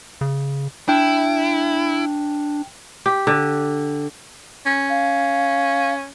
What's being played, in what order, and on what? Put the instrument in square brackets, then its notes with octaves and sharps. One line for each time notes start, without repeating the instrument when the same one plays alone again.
[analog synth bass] C#3
[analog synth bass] D4 [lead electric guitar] E4 [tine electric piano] G5
[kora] G4
D3
[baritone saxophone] C#4
[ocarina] F5